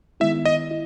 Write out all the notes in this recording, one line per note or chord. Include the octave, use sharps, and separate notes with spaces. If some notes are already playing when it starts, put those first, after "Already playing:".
D#3 G#3 B3 E4 E5
D#5
E4